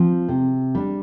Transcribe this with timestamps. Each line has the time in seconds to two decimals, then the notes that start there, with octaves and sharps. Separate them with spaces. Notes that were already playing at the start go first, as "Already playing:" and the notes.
Already playing: F3 C4
0.28 C3
0.75 G3 D4